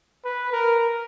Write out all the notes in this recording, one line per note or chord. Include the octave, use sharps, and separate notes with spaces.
B4
A#4